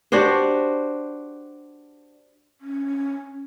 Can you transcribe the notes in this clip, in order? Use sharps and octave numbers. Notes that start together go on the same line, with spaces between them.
D4 F#4 G4 C5
C#4